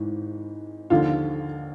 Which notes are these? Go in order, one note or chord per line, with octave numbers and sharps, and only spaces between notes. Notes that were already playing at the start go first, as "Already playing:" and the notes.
Already playing: G#1 G#2 E3
D#2 D3 F3 F4